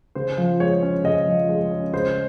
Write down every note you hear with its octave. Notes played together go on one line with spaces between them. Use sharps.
C#3 C5
F3
G#3 C#5
C#4
C#3 D#5
F3
G#3
C#4
C#3 C5